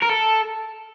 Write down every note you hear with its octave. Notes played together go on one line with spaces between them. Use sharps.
A#4
A4